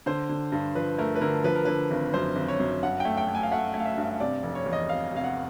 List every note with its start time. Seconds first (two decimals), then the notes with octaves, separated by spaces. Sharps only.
0.06 D3 C5
0.29 D3
0.52 G2
0.75 F3 B4
0.98 A3 A#4
1.15 B4
1.21 D3 A#4
1.44 F3 B4
1.55 A#4
1.65 D3 B4
1.91 G#1
2.14 F#2 C5
2.36 G#1
2.48 C#5
2.60 F#2
2.83 G2 F#5
3.00 A3 G5
3.17 G5
3.28 A3
3.35 G#5
3.43 F5
3.51 A3 F#5
3.74 A3
3.80 F5
3.85 E5
3.97 G2
4.20 C3 D5
4.43 F1
4.55 C#5
4.66 E2
4.73 D#5
4.89 C3 F5
5.13 C3 F5
5.24 F#5